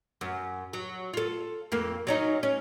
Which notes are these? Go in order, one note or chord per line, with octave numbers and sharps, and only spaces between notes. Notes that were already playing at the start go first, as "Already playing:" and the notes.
F#2
F#3
F4 A4
F2 A#3
F#3 C#4 D#4
C#4